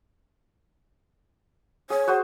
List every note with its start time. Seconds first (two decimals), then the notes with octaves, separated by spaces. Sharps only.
1.90 G#4 C#5
2.07 F#4 G#4 C5